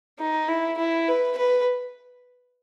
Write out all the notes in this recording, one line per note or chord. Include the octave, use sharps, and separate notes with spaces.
D#4
E4
E4
B4
B4